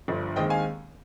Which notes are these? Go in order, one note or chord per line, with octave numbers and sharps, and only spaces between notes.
G1 G2 F3
D#2 D#3 G#3 C4 D#5 G5
F5 G#5